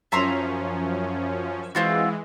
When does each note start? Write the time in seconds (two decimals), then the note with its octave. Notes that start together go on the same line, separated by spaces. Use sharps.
0.12 F#2 F3 C#4 E5 A#5 C6
1.75 E3 G#3 C4 F4 F#4